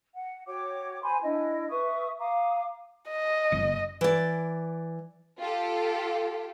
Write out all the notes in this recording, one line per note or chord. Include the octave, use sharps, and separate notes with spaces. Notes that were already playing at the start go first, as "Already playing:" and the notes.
F#5
F#4 C#5 G5 D6
C5 G#5 B5 C6
D4 E4 D#5
B4 E5 C#6 D#6
F5 A#5 D6 D#6
D#5
F#1
E3 D5
F4 G4 A4